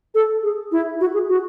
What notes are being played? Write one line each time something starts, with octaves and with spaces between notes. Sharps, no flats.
A4
G#4
E4
F#4
G#4
F#4